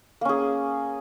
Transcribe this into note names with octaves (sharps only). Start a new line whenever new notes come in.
A#3 C#4 G#4